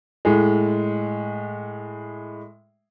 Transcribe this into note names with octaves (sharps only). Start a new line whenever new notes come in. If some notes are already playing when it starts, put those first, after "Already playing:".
A2 G#3